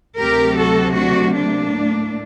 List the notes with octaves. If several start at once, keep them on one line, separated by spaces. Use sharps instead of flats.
D2 C3 F#3 A3 G4 A#4
F#4 A4
D4 F#4
A#3 D4
A2 A3